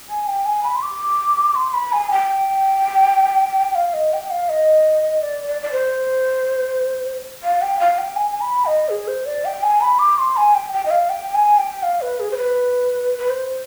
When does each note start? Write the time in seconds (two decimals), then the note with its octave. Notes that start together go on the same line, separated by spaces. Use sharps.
0.09 G#5
0.27 G5
0.45 G#5
0.63 B5
0.75 C6
0.82 D6
1.55 C6
1.74 B5
1.93 G#5
2.11 G5
3.75 F5
3.93 D#5
4.13 G5
4.30 F5
4.49 D#5
5.22 D5
5.48 D5
5.62 D5
5.72 C5
7.43 F5
7.62 G5
7.79 F5
7.98 G5
8.16 G#5
8.31 G#5
8.41 B5
8.66 D#5
8.89 G#4
9.08 C5
9.26 D5
9.45 G5
9.63 G#5
9.81 B5
9.99 D6
10.18 C6
10.37 G#5
10.55 G5
10.73 G5
10.86 D#5
10.91 F5
11.10 G5
11.35 G#5
11.58 G5
11.83 F5
12.01 B4
12.20 G#4
12.31 C5
12.37 B4
13.19 B4
13.30 C5